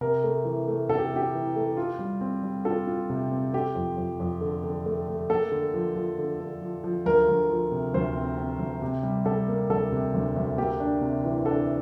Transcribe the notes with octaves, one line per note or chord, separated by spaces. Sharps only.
C3 A#4
A3
E3
A3
C3 A4
G4
A3 G4
E3
A3
F4
G3
C4
G3
F4 A4
F4
C3
C4
A3 G4
F2
F2
F2
D3
D3
A3
A3
A#3 A4
D3
F3
F3
D3
D3
F3
F3
D2 A#4
D2
F3
C3
D2 C5
C4
C4
D2
C3
G3
G3 A4
A#3
D2 A4
C3
D2
D2
A#3 G4
D4
C3
E3
D4 A4